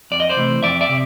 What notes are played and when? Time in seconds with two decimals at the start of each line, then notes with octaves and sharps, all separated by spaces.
0.11 F2 D5
0.20 D#5
0.29 C5 D5
0.37 C3 E3 A3
0.63 F2 D5 E5
0.81 D5 E5
0.89 C3